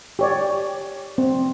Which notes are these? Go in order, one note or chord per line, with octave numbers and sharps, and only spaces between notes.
G4 C#5 D5
C4